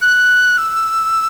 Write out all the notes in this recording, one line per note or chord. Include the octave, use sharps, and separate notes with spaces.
F#6
E6